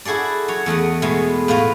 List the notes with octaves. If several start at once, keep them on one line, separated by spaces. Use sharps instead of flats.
E4 F#4 G#4 A4 D5
F#3 C#5
E2 A3 D#5 F#5
B2 G#3 A3 B3
A2 F4 F#4 B4 A#5